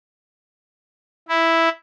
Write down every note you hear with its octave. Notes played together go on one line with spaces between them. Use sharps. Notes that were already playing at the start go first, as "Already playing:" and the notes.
E4